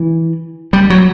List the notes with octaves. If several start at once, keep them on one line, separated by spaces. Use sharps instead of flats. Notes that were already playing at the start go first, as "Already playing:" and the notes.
Already playing: E3
G3
F#3